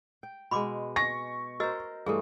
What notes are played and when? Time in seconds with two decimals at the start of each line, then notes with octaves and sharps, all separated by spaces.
0.23 G5
0.51 B2 G#3 B5 C6 D6
0.96 G#5 C#6 A#6
1.60 F#4 A#4 C5 D#5 E6
2.06 G2 E3 A3 G#4 A4